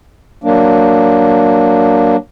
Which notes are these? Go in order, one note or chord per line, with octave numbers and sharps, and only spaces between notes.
F#3 A#3 D4